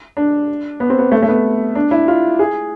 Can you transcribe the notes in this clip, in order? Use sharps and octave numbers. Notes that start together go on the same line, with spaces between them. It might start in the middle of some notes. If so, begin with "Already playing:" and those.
D4
B3
C4
B3
A3
A3
B3
D4
E4
F4
G#4